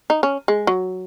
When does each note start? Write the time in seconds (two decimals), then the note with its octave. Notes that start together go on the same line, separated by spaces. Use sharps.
0.10 D#4
0.23 C#4
0.48 G#3
0.67 F#3